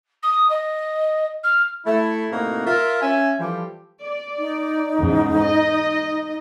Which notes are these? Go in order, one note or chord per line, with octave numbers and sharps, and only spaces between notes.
D#6
D#5
F6
A3 E4
A2 C3 A#3 C4 D#4 F#4
F4 A#4 E5
C#4 E5 G#5
E3 F3 G3 G4 A4 C5
D5
D#4
E2 G#2 C#3
D#5